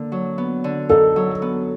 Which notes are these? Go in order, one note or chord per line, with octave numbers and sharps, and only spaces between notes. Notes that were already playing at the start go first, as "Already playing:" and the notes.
Already playing: D3 A#3
F#3
B3
D3
D#4 A4
F#3
B3